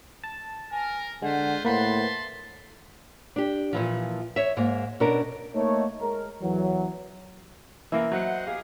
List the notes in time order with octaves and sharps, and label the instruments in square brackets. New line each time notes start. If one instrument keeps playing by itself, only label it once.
[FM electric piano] A5
[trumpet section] A#4 [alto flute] G#5
[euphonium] D3 [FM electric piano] G#3 [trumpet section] F4 B4 C5 [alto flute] F#5
[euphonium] A2 [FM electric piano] A#3 B4 C5 [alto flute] F#5 [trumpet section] A5 B5 C6
[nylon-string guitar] D4 G4
A#2 E3 F3
C#5 E5
G#2 A#3
B2 C#4 D4 A#4
[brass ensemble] A3 A#3 D#4 C#5
G#3 A#4
E2 E3 F#3
[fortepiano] E3 A#3 [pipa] A#4 E5
[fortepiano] F#3 [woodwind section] C5 D#5 F#5
[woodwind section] G4 G#4 [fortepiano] F5